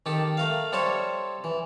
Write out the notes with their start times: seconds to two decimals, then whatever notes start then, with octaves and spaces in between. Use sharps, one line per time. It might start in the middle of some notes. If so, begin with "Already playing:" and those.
0.06 D#3 G4 A4
0.37 A3 A#4 F5
0.72 G3 A4 C5 C#5 E5
1.44 E3